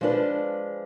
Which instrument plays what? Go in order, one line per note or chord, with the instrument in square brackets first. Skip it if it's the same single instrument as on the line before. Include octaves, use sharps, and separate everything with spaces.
[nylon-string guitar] F3 G#3 D4 F4 B4